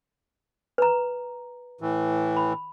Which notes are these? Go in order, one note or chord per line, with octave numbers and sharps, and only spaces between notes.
B4 A#5
A2 E3
B5